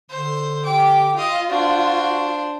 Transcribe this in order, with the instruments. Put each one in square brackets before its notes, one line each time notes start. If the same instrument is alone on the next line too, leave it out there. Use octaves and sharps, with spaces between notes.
[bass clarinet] D3 [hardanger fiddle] C5
[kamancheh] G4 G5 [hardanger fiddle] D6
[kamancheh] F4 [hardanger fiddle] D#5 F5
[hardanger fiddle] D4 C5 [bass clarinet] F#4